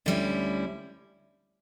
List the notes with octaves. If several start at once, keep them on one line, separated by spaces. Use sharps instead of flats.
D2 D3 G3 C#4 E4